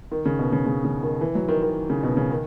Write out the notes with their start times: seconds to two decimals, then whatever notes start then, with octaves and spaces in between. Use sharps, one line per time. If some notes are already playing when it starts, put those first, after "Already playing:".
0.12 D#3
0.26 C#3
0.39 B2
0.53 C#3
0.67 C#3
0.85 C#3
1.03 D#3
1.21 E3
1.35 F#3
1.49 D#3
1.62 D#3
1.90 C#3
2.03 B2
2.17 C#3
2.31 D#3